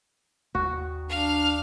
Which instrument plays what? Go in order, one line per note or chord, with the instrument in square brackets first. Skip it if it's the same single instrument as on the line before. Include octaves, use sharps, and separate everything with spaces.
[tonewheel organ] G1 D#2 [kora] F#4
[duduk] D4 [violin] F5 F6